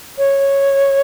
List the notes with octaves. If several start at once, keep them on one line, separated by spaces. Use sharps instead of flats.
C#5